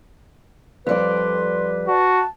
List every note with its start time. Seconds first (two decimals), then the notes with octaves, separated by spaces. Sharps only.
0.87 F2 G3 B4 D5 C6
1.88 F#4 A5